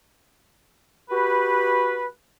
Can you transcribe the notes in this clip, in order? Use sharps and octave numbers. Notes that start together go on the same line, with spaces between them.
F#4 G4 B4